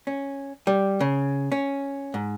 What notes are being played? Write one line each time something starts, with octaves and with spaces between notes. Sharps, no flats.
C#4
G3
C#3
C#4
G#2